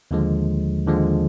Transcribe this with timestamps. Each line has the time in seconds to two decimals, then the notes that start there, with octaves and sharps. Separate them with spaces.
0.11 D#2 D3 F3 G#3
0.87 D#2 D3 F3 G#3